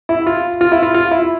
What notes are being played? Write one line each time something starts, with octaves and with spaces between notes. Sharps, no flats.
E4
F4
F4
E4
F4
F4
E4